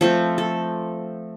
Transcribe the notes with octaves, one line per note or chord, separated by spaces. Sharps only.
F3 A3 C4 A4
A4